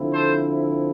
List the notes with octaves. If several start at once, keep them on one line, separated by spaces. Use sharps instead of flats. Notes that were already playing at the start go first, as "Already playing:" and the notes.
Already playing: D3 F3 C4 E4
A4 C5